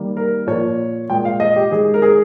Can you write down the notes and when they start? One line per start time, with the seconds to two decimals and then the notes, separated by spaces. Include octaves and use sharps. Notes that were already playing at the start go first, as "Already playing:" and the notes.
Already playing: D#3 G3 A#3
0.17 A#4
0.47 A#2 F3 A#3 C#5
1.10 A#2 G#3 G5
1.25 F5
1.40 D#5
1.56 G4
1.71 D#3 G#3 G#4
1.94 A#4
2.02 G#4